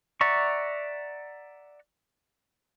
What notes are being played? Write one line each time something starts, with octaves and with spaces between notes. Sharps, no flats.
D5 E5 F#5 A#5 C#6